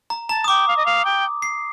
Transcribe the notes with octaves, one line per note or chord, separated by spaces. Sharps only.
A#5
A5 A#5
D#6
G5 D6
F5
D#5
F5
G5
C7